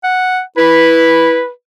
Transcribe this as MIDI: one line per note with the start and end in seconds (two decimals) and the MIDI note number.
0.04 0.41 78
0.57 1.42 64
0.57 1.49 71